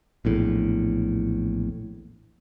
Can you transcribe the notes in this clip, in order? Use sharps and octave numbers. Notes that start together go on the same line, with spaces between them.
A#1 E2 A2